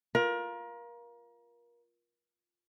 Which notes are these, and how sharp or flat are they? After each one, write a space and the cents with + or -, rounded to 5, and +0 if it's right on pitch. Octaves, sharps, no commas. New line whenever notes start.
F4 +0 A#4 +30